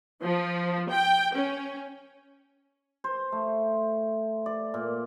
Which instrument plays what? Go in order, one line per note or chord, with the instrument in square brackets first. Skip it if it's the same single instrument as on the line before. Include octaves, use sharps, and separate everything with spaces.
[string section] F3
G5
C#4
[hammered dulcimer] C5
A3
D5
A#2